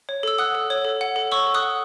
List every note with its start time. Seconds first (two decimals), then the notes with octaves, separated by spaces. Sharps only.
0.09 C#5
0.23 A4 E6
0.38 F#5 D#6 F#6
0.55 A4
0.70 C#5
0.85 A4
1.01 F#5
1.16 A4
1.32 C#5 C#6 E6
1.47 A4
1.54 D#6 F#6
1.62 F#5